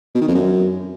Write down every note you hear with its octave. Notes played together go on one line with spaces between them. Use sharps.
B2
D#3
F2
F#2